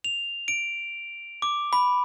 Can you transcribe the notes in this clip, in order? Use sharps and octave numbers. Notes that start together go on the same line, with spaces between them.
F7
D7
D6
B5